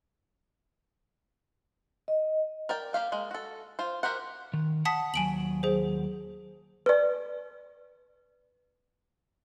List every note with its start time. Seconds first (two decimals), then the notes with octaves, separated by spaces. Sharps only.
2.08 D#5
2.69 A#4 D5 G5
2.93 A#3 G4 F5 G5
3.12 G#3 A#3
3.31 F#4 A4
3.79 F4 C5
4.03 F#4 G4 A#4 C5 F#5
4.53 D#3
4.85 F#5 A5 D#6 B6
5.14 D#2 F#3 G#5 D7 F#7
5.63 G#4 C5
6.86 B4 D5